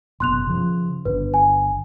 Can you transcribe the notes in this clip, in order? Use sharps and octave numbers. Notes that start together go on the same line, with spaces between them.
F#1 B2 C6 F#6 F7
C#3 F3
G1 D4 B4
G#5